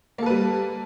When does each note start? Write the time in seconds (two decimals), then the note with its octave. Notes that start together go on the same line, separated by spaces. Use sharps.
0.18 A#3
0.22 A4
0.26 B4
0.30 G3